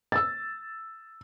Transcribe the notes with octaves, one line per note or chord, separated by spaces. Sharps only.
E6 A6